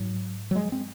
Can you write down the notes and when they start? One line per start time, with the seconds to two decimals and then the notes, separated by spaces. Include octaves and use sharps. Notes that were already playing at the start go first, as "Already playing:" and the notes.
Already playing: G#2 F#3
0.51 F#3
0.56 G#3
0.72 C4